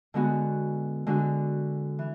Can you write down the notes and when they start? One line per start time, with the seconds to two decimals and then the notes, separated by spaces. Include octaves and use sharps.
0.14 D3 G#3 B3 F#4
1.07 D3 G#3 D4 F#4
1.99 E3